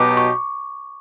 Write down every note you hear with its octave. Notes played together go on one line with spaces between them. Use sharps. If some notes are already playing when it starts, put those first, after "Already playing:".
Already playing: B2 F#3 B3 D#4 G4 D6
C#6